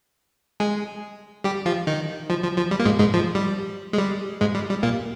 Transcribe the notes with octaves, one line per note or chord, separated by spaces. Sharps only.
G#3 G#4
G3 G4
F3 F4
D#3 D#4
F3
F3
F3
G3
A#3
G#2 G#3
G#2 G#3
F3
G3
G#3
G3
G#2 G#3
G3
G3
A#2 A#3